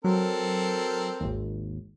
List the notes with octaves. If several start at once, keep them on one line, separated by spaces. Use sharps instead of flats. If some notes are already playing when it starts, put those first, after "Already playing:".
F#3 C4 A4 A#4
G#1 D#2